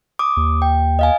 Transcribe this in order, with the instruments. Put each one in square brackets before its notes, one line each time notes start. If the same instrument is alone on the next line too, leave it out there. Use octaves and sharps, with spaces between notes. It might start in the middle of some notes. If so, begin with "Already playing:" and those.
[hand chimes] D6 D#6
[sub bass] D#2
[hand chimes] G5
D#5 F5 G#5